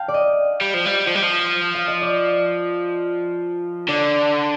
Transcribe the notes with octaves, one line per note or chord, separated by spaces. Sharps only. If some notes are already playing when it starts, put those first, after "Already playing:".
Already playing: F5 G5 A5
D5
D#5
G3
F3
G3
F3
G3
F3
F5
D#5
D5
D3 D5